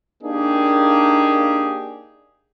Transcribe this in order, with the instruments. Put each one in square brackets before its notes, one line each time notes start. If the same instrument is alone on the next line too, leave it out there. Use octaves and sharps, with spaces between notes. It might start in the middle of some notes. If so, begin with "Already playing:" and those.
[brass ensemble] A#3 D4 D#4 G4 G#4